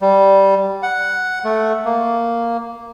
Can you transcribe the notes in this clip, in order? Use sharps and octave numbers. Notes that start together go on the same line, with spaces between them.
G3
F#5
A3
A#3